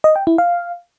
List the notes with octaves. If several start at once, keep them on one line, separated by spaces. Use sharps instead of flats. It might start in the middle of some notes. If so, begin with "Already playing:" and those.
D#5
G5
E4
F5